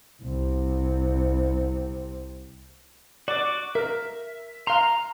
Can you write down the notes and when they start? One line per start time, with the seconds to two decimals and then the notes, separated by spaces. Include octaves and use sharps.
0.22 C2 C3
3.28 F#4 D5 D6
3.75 A#4 E5
4.67 F5 A#5 C6